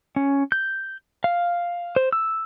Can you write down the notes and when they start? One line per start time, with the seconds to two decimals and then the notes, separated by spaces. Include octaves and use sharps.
0.16 C#4
0.52 G6
1.24 F5
1.96 C5
2.13 E6